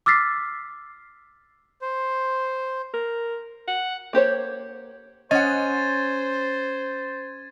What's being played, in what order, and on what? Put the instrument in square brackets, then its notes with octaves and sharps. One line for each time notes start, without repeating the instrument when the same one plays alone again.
[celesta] D6 E6 F6 A6 B6 C7
[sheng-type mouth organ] C5
[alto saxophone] A#4
F#5
[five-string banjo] A#3 G4 C5 C#5
[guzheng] C#4 [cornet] C5 [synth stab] D#5 F#5 [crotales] G#6 A6 D#7